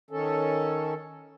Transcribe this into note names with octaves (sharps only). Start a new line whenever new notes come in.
D#3 C#4 A4